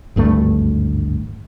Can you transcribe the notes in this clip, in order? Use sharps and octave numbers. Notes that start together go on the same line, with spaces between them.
G#1 D2 G2 A3